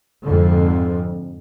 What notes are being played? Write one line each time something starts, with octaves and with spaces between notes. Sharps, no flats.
F2 G#2 D3